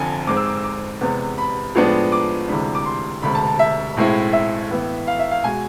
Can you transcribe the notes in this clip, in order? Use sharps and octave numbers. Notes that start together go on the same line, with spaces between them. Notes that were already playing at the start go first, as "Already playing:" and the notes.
Already playing: F1 F2 D3 G#5
G#2 G#3 C4 D6
E6
D6
E6
D6
E2 C3 G#3 B3
B5
A2 F3 G#3 B3 D4
D6
D2 C3 E3 G#3 D4 B5
D6
C6
E1 D2 C3 G#3 B5
A5
A5
E5
B1 A2 G#3 C4 E4
E5
A2 E3 B3
F5
E5
F5
B2 G#3 G#5